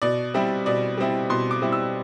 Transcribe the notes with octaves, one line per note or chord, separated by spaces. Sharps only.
B2 D5
G3 C4 E4
B2 D5
G3 C4 E4
B2 C6
D6
G3 C4 E4
E6